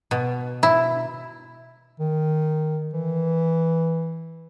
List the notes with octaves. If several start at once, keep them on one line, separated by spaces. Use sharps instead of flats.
B2
E4
D#3
E3